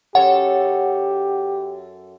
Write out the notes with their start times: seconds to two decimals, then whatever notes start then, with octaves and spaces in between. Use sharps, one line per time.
0.15 F#2 G4 A4 C#5 F#5